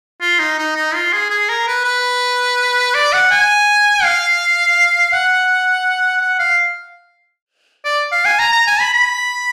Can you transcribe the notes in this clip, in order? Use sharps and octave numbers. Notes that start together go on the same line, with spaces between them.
F4
D#4
D#4
D#4
F4
G#4
G#4
A#4
B4
B4
D5
F#5
G#5
F5
F#5
F#5
F5
D5
F5
G#5
A#5
A#5
G#5
B5
B5